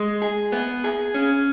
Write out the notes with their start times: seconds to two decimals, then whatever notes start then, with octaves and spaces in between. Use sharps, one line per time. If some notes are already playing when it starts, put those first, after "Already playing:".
Already playing: G#3
0.22 G#4
0.52 B3
0.84 G#4
1.14 C#4